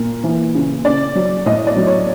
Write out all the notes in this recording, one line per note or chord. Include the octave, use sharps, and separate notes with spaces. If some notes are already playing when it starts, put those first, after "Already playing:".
Already playing: A#2 A#4
E3
C#3
C#3 D5
F#3
A2 D#5
D5
F#3
C#5